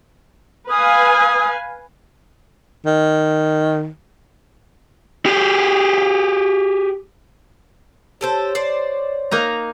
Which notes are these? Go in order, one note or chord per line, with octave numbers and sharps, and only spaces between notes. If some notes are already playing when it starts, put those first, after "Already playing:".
B4 F5 G#5 D#6
D#3
G4 G#4
G4 A4 C5 C#5
C5 D5
A#3 D#4 A#5